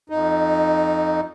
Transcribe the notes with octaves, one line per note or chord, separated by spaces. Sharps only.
F2 D#4